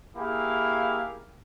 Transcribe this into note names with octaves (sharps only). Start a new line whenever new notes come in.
A#3 E4 G4 G#4 F5